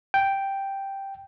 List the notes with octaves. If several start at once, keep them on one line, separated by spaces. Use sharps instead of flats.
G5